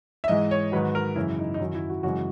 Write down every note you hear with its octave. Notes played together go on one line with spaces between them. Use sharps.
E5
G#2 E3 G#3 D#5
C#5
G#2 D#3 F#3 B4
A#4
F#2 C#3 E3 G#3 E4
D#4
D#4
F#2 D#3 F#3 E4
E4
F#4
F#2 C#3 E3 G#3 F#4